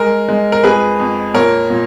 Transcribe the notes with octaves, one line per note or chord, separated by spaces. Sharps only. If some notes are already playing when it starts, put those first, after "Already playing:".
Already playing: G#3 A#4
G#3
A#4
F2 G#4 B4
F2
A#2 A#4 C#5
A#2